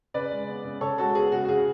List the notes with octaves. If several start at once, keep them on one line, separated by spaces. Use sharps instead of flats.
C#3 B4 D5
G#3
B3
C#3
C#3 A4 C#5
G#3 F#4 A4
B3 G#4
C#3 F#4
F#4
C#3 G#4